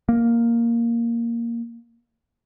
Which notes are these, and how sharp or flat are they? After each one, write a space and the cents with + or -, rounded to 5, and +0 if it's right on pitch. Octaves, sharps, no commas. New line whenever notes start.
A#3 +0